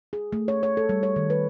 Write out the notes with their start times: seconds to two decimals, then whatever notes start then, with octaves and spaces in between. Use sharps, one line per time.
0.13 G#4
0.33 A3
0.48 C#5
0.63 C#5
0.77 A4
0.89 G3
1.03 C#5
1.16 D#3
1.30 B4